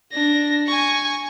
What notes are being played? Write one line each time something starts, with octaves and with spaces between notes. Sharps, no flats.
D4 A#6
G#5 C#6